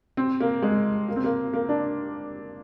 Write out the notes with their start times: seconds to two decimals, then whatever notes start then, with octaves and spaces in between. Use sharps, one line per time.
0.17 C4
0.41 A#3
0.62 G#3
1.09 A#3
1.16 C4
1.24 A#3
1.54 A#3
1.69 D4